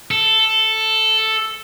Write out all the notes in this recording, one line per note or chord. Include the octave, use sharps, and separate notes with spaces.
A4